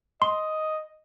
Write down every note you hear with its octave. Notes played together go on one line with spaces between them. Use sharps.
D#5 C6